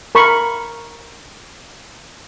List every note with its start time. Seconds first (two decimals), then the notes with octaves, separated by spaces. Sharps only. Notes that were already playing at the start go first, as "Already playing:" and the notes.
0.15 A#4 B5 C#6